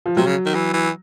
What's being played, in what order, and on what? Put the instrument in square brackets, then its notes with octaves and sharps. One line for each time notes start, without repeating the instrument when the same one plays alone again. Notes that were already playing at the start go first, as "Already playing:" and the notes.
[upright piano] F3
[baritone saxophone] C3 [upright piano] F#3
[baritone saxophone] C#3
D#3
E3
E3